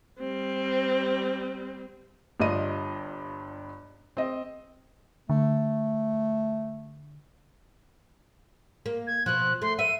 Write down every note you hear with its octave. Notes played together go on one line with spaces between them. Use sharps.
G3 C4
G1 G2 F4 D5 D#5 D#7
C4 D#5
D3 A3
A#3
G#6
B2 F3 F#6
A3 C6
B4 E5 D#7